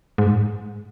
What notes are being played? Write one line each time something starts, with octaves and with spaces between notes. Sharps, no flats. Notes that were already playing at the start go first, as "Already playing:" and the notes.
G#2